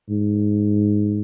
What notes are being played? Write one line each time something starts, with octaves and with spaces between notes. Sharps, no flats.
G#2